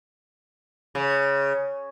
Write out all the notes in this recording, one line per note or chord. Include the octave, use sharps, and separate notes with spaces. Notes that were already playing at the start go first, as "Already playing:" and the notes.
C#3